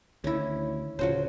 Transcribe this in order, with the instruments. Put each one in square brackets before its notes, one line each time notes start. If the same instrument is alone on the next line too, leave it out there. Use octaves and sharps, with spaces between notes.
[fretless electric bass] D2 D#3 [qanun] C#4 E4
[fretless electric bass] D1 C#3 [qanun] F3 F#4 C5 [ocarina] C#5